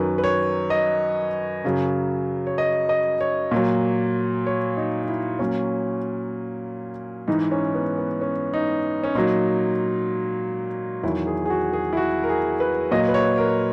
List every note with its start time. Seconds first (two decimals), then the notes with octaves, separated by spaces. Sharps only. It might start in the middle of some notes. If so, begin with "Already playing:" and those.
Already playing: F#2 D#3 F#3 B4
0.18 B4
0.24 C#5
0.70 D#5
1.64 F#2 C#3 F#3
2.47 C#5
2.58 D#5
2.89 D#5
3.21 C#5
3.51 A#2 F#3
4.46 C#5
4.77 D#4
5.03 D#4
5.08 E4
5.39 A#2 F#3 C#4
7.27 G#2 E3 D#4
7.52 C#4
7.74 B3
7.98 B3
8.21 C#4
8.53 D#4
9.04 C#4
9.15 A#2 F#3 D#4
11.03 E2 D#3 F#3 E4
11.27 G#4
11.45 G#4
11.50 F#4
11.73 G#4
11.93 E4
11.97 F#4
12.23 A#4
12.29 G#4
12.60 B4
12.91 A#2 F#3 D#5
13.08 B4
13.14 C#5
13.38 A#4